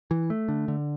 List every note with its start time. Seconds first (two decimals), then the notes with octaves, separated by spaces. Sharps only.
0.11 E3
0.30 A3
0.48 D3
0.68 D3